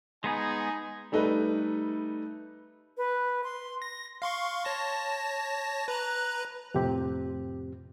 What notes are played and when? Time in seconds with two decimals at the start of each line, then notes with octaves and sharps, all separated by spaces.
0.24 G#3 B3 D#4 G#4 G#5
1.12 G3 A3 D#4 A4 B4
2.97 B4
3.44 C6
3.82 A#6
4.22 F5 C6 C#6
4.65 C#5 A5 A#6
5.88 B4 A#5 F#6
6.74 F2 A2 C3 F3 C4 G4